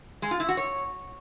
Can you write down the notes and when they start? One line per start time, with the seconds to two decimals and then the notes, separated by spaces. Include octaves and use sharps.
0.22 G#3
0.31 F4
0.40 E4
0.49 F#4
0.57 C#5